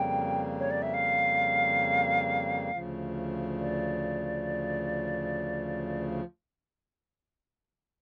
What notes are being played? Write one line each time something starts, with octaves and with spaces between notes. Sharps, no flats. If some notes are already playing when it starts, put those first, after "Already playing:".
Already playing: F2 C#3 G3 A#3 G5
C#5
D5
E5
F5
D2 C#3 F3
D5